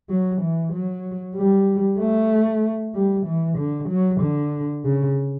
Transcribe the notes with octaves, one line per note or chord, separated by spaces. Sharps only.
F#3
E3
F#3
G3
A3
G3
E3
D3
F#3
D3
C#3